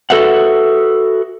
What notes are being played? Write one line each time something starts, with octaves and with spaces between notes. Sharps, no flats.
F#4 A4 B4 E5 F#5